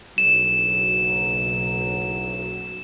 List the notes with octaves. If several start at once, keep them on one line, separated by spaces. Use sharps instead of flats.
F#1 B1 F#3 E7